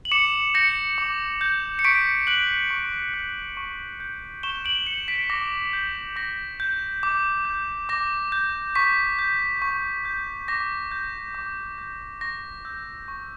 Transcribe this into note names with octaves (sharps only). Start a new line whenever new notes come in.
F#7
D6 C#7 E7
G6 A#6 C#7
D6
G6
C#7
C#6 B6 D7
F#6 D7 F#7
C#6
F#6
C#6
G6
C#6 E7 G7
D7 F#7
G6 C#7 E7
B6 D7
D6 A#6
G6
D6 A#6
G6
D6
G6
D6 A#6
G6
C#6 B6
G6
C#6
G6
D6 A#6
G6
D6
G6
C#6 A#6
E6 G6
C#6